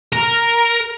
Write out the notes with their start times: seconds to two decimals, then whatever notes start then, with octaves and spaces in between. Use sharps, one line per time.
0.13 A#4